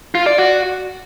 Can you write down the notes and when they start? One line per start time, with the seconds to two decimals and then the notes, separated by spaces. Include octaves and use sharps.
0.15 F4
0.26 D5
0.38 F#4